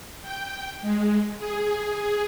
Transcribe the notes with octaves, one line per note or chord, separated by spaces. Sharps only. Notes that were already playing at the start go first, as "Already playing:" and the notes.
G5
G#3
G#4